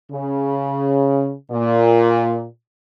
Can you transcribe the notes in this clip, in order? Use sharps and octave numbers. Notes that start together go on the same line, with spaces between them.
C#3
A#2